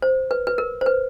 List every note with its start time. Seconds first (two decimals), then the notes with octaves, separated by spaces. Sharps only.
0.02 C5
0.31 B4
0.47 B4
0.58 A#4
0.81 C5
0.86 B4